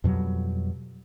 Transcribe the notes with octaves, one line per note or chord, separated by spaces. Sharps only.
F2 B2 F#3 G3